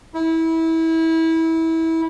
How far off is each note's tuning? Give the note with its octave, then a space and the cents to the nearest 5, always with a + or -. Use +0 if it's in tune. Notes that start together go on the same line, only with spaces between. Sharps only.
E4 -25